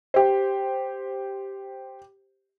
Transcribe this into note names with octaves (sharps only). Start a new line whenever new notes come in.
G4 C5